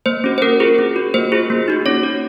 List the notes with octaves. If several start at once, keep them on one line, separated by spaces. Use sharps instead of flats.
A#3 C5
C#4 F#4
C5
C#4 A#4
F4 G#4
C#4
F#4
A#3 C5
F4 G#4
A#3
D#4 F#4
C#4 C#5
F#4